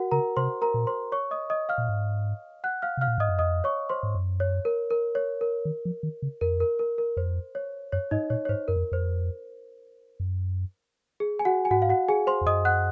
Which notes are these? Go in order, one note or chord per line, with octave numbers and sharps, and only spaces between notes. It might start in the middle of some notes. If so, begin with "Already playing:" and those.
Already playing: F#4 A#4 F#5
C#3 A#4 A#5
C3 C5 C6
A#4 A#5
A#2
C5 C6
C#5 C#6
D#5 D#6
D#5 D#6
F5 F6
A#2
G#2
F#5 F#6
F5 F6
C3 F5 F6
A#2
G#2 D#5 D#6
F#2
F2 D#5 D#6
C#5 C#6
C5 C6
G#2
F#2
C#5
A#4
A#4
C#5
A#4
D#3
F3
D#3
C#3
F2 A#4
A#4
A#4
A#4
F2 C5
C#5
F#2 C#5
G#2 D#4 D#5
A#2 C#5
C#5
G#2 C5
F#2 A#4
F2
F2 C5
F#2
G#4
G#5
F#4 F#5
G#5
G#2 F#4 F#5
F5
F#4 F#5
G#4 G#5
C5 C6
F2
F#2 D#5 D#6
F#5 F#6